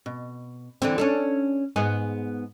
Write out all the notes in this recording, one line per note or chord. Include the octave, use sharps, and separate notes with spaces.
B2
D3 E3 C4
C#4 D4 A4
G#2 B3 G#4